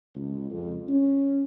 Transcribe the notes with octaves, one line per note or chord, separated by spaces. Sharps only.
C#2
F2
C#4